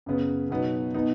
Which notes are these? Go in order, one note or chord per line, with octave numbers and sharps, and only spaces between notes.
F#2 C#3 B3
B2 F#3 B3 D#4
B2 B3 D#4